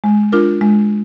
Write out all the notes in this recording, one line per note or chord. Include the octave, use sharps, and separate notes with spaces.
G#3
D4 F4 A#4
G#3